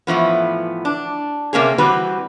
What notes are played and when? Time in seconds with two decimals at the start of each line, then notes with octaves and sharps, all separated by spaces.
0.07 A2 E3 F3 B3
0.85 D4
1.53 C3 A#3 C#4 G#4
1.78 E3 G3 C4 F#4 B4